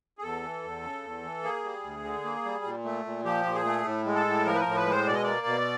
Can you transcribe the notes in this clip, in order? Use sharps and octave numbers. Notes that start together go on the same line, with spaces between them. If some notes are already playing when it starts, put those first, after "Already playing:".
G#4
E2 A4
E3
E2
C#3
E2
E3
A#3 G#4
G3
D2
D3
A#3
G3
A#2
A3
A#2
F3 G4
A#2
G#4
A3
A2
G#3
A4
A2
F3 A#4
B4
A#4
A2
B4
G#3
C5
B2 D5
D#5
A#3 D5
B2